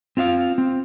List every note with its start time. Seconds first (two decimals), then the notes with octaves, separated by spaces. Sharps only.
0.17 C4 F4 E5 F5
0.58 C4